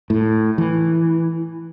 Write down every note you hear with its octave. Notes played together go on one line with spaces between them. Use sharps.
A2
E3